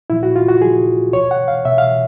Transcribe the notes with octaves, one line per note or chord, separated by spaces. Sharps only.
A#2 F3 E4
F#4
F4
F#4
A#2 F3 G#4
B2 C#5
F#5
F5
B2 E5
F5